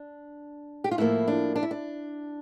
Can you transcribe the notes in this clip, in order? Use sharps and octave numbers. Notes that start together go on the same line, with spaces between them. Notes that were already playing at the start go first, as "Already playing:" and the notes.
Already playing: D4
G4
F4
A2 F3 A#3 E4
D4
D4
E4
D4